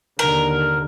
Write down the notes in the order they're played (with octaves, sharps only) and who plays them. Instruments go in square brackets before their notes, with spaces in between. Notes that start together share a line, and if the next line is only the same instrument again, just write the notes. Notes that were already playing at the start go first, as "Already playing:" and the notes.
[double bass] D#2 D3 [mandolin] A#4